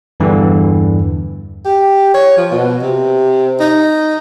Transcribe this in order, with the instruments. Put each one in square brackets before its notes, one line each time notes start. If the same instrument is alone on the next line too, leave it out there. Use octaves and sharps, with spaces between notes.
[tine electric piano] E2 G2 D3 E3
[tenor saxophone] G4
C#5
F3
B2
C3
D#4